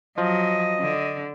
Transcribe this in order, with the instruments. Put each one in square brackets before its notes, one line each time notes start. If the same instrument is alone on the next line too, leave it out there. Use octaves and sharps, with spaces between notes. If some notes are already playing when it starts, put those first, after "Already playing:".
[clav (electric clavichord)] F3 [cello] F#3 [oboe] D#5
[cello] D3